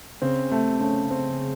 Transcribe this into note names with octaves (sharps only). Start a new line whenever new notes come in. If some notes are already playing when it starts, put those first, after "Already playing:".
C#3 C4
C3 A3
C#3 A3
C4